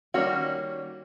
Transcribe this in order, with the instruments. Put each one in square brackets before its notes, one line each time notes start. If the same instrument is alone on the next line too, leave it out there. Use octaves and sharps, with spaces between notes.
[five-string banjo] D#3 G3 A#3 C#4 F#4